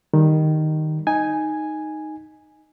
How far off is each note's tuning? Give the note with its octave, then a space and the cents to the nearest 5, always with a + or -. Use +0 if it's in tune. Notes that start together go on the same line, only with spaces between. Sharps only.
D#3 -5 G3 +0
D#4 +0 G#5 +0